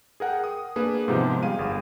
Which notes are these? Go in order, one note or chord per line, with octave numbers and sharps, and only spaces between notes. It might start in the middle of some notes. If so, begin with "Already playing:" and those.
G#4 A#4 F#5 G5
D#6
A#3 D4 G#4 B4
G#2 C3 D#3 F3 B3 G4
G3 G#4 F5 D#7
G1